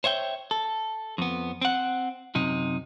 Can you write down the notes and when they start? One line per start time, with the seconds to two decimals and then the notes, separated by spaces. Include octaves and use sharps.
0.04 C5 C#5 E5 G5
0.51 A4
1.18 F2 B3
1.62 C4 F#5
2.35 F#2 C3 D#4